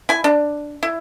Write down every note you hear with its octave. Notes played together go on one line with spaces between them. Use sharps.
E4 G#5
D4
E4